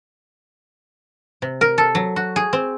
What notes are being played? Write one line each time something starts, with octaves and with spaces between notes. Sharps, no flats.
C3
A#4
A4
F#3
F#4
G#4
C4